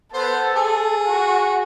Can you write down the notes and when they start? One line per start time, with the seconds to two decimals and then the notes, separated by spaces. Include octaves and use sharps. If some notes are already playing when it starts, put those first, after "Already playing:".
0.14 B3 A4 C5
0.56 G#4
1.06 F#4